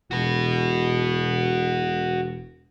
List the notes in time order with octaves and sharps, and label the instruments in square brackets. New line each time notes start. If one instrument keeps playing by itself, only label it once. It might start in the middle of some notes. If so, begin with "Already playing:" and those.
[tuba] E1 [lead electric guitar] F#4 B4